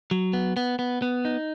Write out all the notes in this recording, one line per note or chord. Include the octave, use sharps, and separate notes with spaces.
F#3
B3
B3
B3
B3
D#4